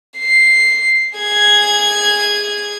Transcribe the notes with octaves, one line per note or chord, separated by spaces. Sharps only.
C7
G#4 G#6